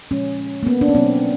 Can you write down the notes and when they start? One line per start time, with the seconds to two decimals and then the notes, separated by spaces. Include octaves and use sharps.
0.11 A#2 F3 G#3 C#4
0.63 A#3
0.67 B3
0.81 D4
0.88 C#4
0.95 B2 F#3 A#3 C4